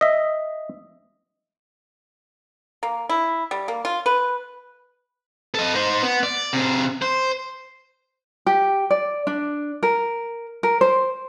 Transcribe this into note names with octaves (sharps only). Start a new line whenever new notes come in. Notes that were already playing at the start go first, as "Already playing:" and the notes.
D#5 E5
A#3
E4
G3
A#3
F4
B4
A4 D#5
D#4 C5
B3
D5
C3 G#4
C5
G4
D5
D4
A#4
A#4
C5